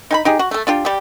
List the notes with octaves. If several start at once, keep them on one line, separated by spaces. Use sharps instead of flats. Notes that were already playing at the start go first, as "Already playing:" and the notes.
D#4 G#5 B5
D#4 G4 G#4
F#4
A3 A4
D4 F4 G4
G3 G4